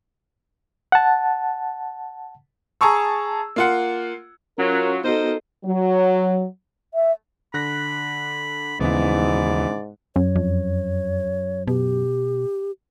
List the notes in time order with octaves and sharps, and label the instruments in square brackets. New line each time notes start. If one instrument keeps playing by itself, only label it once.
[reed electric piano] F#5 A5
[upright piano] G#4 A5 A#5 C#6 E6
A#3 F4 F#5
[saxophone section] F#3 [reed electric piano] C#4 [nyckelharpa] F4 [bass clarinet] A#4
[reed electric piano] B3 F#4 [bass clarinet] D#4 [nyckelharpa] A4 D#5 [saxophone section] A#4 C5
[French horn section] F#3
[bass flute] E5
[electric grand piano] D3 F#6 A#6 [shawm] B5
[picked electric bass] D#2 C#3 E3 [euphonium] G#2 [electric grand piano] B3 E4 [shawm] D5
[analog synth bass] F#2 [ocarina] C#5
[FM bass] F2
[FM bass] B2 [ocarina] G4